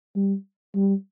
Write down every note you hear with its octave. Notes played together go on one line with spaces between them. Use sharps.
G3
G3